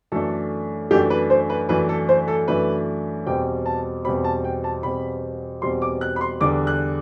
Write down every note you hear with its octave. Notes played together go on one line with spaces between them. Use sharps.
F#2 E3 A3 D4 A4
F#2 E3 A3 D4 G4
B4
C5
B4
F#2 E3 A3 D4 B4
A4
C5
A4
F#2 E3 A3 D4 B4
E2 B2 G3 C4 G5
A5
E2 B2 G3 C4 B5
A5
G5
A5
E2 B2 G3 C4 B5
E2 B2 G3 C4 C6
D6
F#6
B5
C6
E2 D3 G3 D4 D6
F#6